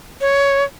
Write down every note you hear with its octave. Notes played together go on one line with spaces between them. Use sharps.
C#5